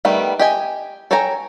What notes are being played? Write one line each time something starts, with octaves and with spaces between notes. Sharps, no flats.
D#3 G3 A3 B3
G4 D#5 G#5
A4 C#5 G5 G#5 A#5